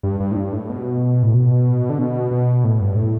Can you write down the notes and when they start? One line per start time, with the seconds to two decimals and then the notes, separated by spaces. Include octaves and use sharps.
0.03 G2
0.20 G2
0.31 A2
0.36 G2
0.53 A2
0.70 B2
1.23 A2
1.34 B2
1.90 D3
1.99 B2
2.31 B2
2.64 A2
2.80 G2
2.97 A2